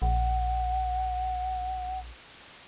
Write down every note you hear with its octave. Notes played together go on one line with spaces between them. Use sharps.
A#1 F#5